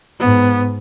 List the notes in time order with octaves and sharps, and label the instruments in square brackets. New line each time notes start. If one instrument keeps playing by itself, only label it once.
[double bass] G#2 [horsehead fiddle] B3